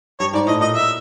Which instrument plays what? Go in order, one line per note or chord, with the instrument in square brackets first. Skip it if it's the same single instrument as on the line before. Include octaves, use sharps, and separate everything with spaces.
[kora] G2 [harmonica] C#5
[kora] G#2 [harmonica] D5
[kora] A2 [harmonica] D#5
[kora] A#2 [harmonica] D#5
[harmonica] E5